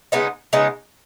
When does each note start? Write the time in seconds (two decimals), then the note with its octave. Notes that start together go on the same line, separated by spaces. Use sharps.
0.12 C#3 G#3 B3 D#4
0.53 C#3 G#3 B3 D#4